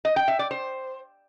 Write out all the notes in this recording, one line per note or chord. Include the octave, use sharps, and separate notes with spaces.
D#5
G5
E5
D5
C5